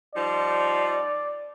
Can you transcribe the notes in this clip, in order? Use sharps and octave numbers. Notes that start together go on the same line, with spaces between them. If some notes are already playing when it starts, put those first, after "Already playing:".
F3 G3 D#4 D5